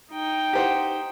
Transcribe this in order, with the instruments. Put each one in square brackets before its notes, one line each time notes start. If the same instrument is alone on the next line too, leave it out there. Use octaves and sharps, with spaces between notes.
[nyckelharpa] D#4 G5
[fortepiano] G4 C5 F#5